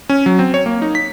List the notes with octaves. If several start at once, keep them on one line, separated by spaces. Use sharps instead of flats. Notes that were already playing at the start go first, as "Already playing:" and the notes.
C#4
F#3
C4
C#5
A#3
D#4
B6